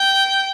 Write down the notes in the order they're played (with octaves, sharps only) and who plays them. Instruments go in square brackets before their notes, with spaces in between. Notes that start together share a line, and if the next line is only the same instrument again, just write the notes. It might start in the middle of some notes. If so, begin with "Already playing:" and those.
Already playing: [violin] G5